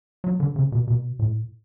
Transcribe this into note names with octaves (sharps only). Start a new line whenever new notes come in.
F#3
D3
C#3
B2
B2
A2